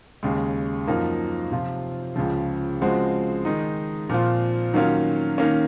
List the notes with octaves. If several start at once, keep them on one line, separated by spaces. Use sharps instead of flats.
D#2 C#3 G#3
F#2 F3 A#3 D#4
C3 F3 C4 F4
C#2 C#3 F3
C#3 F3 G#3 C4 F#4
D#3 G#3 D#4
A#2 F3 C4 F4
D#3 F#3 A#3 C#4 F4
D#3 A#3 C#4